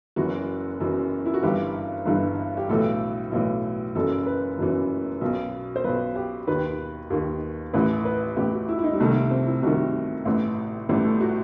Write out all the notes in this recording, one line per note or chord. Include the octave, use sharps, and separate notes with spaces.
F#1 F#2 E3 F#4
F#1 F#2 E3
E4
F#4
G1 G2 E3 G4
G1 G2 E3
G4
B1 A2 E3 A4
B1 A2 E3
F#1 F#2 E3 A4
B4
F#1 F#2 E3
B1 B2
C5
B1 B2 B4
G4
D#2 D#3 B4
D#2 D#3
A1 A2 E3 B4
B4
A1 A2 E3 G4
F#4
E4
E4
D#4
G3
C2 C3 D#3 A3
A3
C4
E4
C2 C3 D#3 F#4
A1 A2 E3
A1 A2 E3 G3
A3
F#4